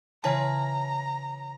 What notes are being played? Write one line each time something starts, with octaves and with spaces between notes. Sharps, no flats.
C#3 E3 F4 C#5 A5 A#5